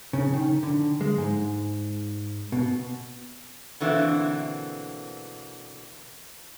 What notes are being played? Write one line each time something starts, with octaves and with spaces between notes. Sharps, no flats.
C#3
D#3
D3
G#3
G#2
B2
B2 D3 E3 A#3 C4